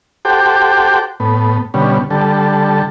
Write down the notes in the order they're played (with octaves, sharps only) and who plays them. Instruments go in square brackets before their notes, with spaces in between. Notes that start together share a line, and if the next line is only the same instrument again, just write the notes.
[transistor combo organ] F#4 G4 A4 C5 G5 D6
A2 B3
B2 D3 G3 C#4
D3 G3 A4